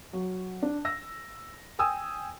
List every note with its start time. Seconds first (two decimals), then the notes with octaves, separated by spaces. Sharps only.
0.13 F#3
0.62 D4
0.85 E6 A#6
1.79 G5 G#5 D#6 E6